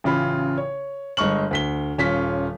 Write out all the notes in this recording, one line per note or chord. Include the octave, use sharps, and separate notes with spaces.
A1 C#3 F4 B5
C#5
G1 G#3 D#5 C#6 F6 F#7
D2 B6 G7
D#1 C#4 F4 B6